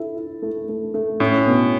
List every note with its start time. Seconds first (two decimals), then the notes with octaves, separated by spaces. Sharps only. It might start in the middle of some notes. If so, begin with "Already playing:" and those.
Already playing: E4 A4
0.16 E4
0.42 A3
0.69 A3
0.94 A3
1.20 A2 C#4
1.47 B2